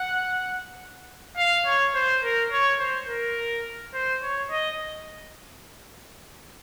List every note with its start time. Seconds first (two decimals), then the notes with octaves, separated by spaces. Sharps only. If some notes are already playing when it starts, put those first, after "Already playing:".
Already playing: F#5
1.37 F5
1.66 C#5
1.95 C5
2.23 A#4
2.52 C#5
2.79 C5
3.08 A#4
3.94 C5
4.22 C#5
4.50 D#5